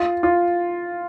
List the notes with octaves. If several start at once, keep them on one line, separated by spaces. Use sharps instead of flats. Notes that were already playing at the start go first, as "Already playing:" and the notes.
Already playing: F4
F4